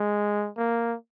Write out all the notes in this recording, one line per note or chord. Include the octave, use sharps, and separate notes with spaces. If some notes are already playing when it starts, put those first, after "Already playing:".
Already playing: G#3
A#3